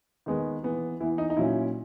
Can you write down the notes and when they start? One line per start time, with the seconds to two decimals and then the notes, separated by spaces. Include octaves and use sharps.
0.26 D#3 G#3 B3
0.63 E3 B3
1.00 E3 B3 E4
1.18 D#4
1.30 D#4
1.37 A#2 F#3 C#4 E4